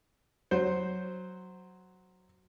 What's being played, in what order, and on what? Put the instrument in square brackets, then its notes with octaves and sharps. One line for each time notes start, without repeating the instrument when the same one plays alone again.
[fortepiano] F#3 C5